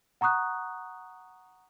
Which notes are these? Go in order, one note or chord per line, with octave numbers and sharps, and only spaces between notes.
F#5 A#5 C#6 D#6 F#6